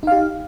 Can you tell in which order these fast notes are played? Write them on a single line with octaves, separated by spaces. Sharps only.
D#4 F5 G4